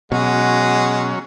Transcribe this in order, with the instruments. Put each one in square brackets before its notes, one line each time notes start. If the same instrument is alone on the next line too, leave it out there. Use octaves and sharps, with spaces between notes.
[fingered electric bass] B2 [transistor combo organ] F#3 C#4 [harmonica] G#3 [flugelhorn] F#5